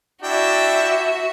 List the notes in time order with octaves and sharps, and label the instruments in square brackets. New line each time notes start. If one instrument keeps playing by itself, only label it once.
[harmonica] D4 E4 G5 [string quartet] F#4 E5